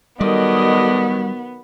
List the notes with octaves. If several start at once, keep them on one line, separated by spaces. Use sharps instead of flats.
D#3 F#3 G3 B3 A4 D5 D#5